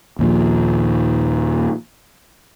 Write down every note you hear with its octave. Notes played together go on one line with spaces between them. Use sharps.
D#2 A#2 F3